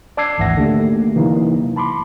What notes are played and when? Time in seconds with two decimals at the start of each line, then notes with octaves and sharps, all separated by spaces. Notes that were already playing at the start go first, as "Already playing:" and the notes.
0.17 D5 A5 D6 E6 G#6 C7
0.38 G#1 D2 E3 E5 F#5 A#6
0.57 D3 D#3 A3 A#3 G4
1.15 C3 E3 F#3 A#3 D#4 E4
1.76 A5 B5 C6 D6